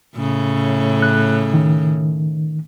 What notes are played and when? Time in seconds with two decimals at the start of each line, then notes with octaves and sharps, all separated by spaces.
0.16 A2 C#3
1.02 F#6
1.54 D#3